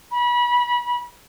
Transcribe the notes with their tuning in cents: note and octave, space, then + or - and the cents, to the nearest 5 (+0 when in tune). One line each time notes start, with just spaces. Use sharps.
B5 -30